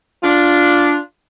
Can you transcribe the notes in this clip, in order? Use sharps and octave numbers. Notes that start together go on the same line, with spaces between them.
D4 F4